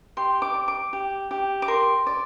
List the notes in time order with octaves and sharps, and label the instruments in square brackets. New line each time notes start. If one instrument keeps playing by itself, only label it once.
[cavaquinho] G4 C6
D6
D5
D6
G4
G4
D6
A#4 C6
D5